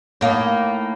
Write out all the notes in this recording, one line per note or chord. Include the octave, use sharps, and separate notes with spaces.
A2 A#3 D#4